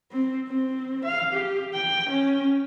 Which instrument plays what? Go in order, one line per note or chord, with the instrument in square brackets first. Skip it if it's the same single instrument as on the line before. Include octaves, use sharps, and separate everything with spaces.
[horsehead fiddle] C4
C4
F5
G4
G5
C#4